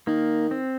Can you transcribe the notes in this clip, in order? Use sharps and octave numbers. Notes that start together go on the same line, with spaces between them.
D#3 A#3
C4